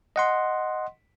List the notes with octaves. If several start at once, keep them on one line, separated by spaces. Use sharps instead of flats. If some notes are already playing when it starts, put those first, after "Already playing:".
D#5 F#5 C6